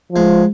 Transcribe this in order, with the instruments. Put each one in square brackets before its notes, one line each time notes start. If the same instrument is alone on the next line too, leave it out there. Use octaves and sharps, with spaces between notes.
[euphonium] F3 [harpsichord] G#3